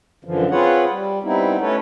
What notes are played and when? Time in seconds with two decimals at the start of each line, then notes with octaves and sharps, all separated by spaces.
0.25 F#2 D3 E3 F3
0.51 C4 F4 G#4 B4 C#5 F#5
0.90 G3
1.23 G3 B3 C4 D#4 E4
1.61 A3 C#4 E4 A4 B4 C#5